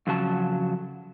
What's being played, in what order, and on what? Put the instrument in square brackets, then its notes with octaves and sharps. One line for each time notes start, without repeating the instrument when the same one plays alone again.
[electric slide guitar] F2 C#3 F#3 A5